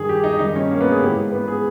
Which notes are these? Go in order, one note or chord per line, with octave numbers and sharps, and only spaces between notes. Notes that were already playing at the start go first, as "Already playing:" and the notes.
Already playing: G2 D#3 G#4
G4
D#4
G2 D#3 D#4
C#4
A#3
B3
G#4
G#2 E3 G4
B3
G#4